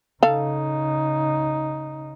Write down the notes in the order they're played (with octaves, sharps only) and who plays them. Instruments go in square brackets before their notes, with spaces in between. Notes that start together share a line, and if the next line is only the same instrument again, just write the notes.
[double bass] C#3 D#4 [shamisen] A4 F5